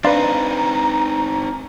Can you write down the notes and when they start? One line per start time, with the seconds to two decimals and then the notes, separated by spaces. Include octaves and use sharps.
0.04 C4 D4 D#4 B4 D5 F5 A#5 C6